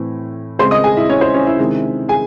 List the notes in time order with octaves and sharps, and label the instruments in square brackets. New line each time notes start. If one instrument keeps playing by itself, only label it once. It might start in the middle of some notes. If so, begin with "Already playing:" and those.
Already playing: [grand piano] A2 E3 C4
C#3 G#3 C4 C5 C6
D#5 D#6
G#4 G#5
E4 E5
C#4 C#5
C5
C#4 C#5
E4 E5
C3 D#3 G#3 C4
G#4 G#5